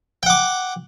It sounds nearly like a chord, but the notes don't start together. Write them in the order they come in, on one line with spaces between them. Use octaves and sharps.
G5 F#5 D6